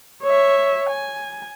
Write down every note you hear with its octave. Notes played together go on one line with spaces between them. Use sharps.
C#5 E5
G#5